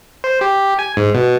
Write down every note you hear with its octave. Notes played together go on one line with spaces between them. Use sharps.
C5
G4
G#5
G#2
B2